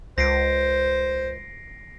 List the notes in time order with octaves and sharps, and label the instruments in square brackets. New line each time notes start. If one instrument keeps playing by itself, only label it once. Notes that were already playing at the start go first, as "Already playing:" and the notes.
[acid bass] C#2 [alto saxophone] C5 [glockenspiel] A#6 C7 D7